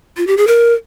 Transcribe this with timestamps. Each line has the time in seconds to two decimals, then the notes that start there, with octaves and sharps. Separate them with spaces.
0.17 F4
0.27 G4
0.37 G#4
0.47 A#4